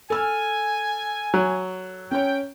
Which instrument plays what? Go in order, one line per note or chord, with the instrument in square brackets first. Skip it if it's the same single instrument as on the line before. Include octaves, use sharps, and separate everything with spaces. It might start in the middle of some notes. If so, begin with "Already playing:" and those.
[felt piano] A4 E6 F6 [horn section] G#5
[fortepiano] F#3
[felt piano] C#4 C#5 [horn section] G5